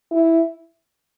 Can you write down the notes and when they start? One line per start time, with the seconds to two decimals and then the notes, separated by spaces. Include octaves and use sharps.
0.11 E4